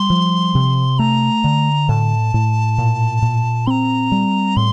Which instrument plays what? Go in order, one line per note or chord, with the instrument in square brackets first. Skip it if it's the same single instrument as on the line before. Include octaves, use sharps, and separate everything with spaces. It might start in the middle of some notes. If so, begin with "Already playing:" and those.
Already playing: [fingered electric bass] G3 [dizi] C6
[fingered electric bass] F3
C3
[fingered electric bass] A3 [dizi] A#5
[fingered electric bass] D3
[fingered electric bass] A2 [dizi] A5
[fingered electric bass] A2
A#2
A#2
[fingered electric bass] C4 [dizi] A#5 C6
[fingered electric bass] G3
[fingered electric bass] A2 [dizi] C6